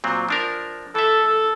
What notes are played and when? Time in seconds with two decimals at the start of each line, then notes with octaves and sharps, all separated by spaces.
0.04 A#2 F#3 C4
0.29 F3 D4 A#4
0.95 E3 A4 E5
1.25 A4